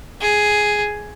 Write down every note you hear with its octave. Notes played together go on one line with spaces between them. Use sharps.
G#4